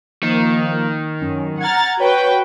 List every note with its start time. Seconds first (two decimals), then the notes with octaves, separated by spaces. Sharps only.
0.23 D#3 F3 A#3
1.22 F#2 C#4
1.61 F#5 A#5 F6 G#6 A6
2.00 F#4 B4 C#5 G5